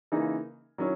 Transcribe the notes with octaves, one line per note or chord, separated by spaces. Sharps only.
C#3 E3 A#3 D#4
D#3 F#3 C#4 E4